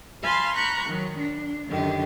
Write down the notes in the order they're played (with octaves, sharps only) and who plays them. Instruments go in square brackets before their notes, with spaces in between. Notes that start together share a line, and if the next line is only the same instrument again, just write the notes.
[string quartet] F5 G#5 A5 B5 C6
A#5 B5 C#6 F#6 G6
D#3 F#3
D4
F#2 D3 D#3 G4